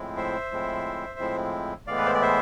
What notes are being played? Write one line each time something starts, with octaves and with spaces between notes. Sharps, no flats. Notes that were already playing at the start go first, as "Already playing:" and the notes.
Already playing: A2 F3 G#3 C4 E4
C5 E5
A2 F3 G#3 C4 E4
A2 F3 G#3 C4 E4
A2 E3 G#3 B3 E4 D5 F5
B4
C5
D5
C5 E5